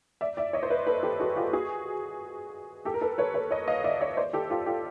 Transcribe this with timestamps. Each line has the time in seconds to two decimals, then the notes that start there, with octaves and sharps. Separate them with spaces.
0.21 D5 E5
0.37 D5 E5
0.53 C#5 D#5
0.63 C5
0.70 B4 C#5
0.87 A4 B4
1.03 G4 A4
1.20 F#4 G#4
1.36 F4 G4
1.53 F#4 G#4
2.85 G4 A4
2.94 A#4
3.01 A4 B4
3.18 B4 C#5
3.34 B4 C#5
3.51 C#5 D#5
3.68 D#5 F5
3.84 D5 E5
4.01 C#5 D#5
4.17 C5 D5
4.33 G4 A4
4.50 F4 G4
4.66 F4 G4